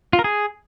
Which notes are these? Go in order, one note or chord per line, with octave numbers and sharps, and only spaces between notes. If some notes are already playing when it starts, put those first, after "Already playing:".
F4
A#4
G#4